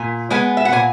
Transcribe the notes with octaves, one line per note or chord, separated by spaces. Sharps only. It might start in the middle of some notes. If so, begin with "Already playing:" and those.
Already playing: A#2 G#5
G#3 B3 G#5
E5
F#5
A#2 G#5